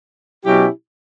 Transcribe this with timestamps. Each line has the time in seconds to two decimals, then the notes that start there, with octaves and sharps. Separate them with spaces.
0.43 B2 F#3 C#4 E4 G4